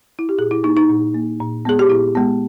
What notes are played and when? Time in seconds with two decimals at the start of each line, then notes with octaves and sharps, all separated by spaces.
0.19 E4
0.29 G4
0.38 A#2 G#4
0.51 E4
0.63 A#3 D#4
0.77 D#4
0.89 A#2
1.14 A#3
1.40 A#2
1.65 G#3 B3 G#4
1.79 G4
1.90 A#2 E4
2.15 G#3 B3